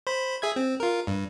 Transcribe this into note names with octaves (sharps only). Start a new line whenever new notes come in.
C5 B5
G#4 E5 G#6
C4
F4 A#4
G2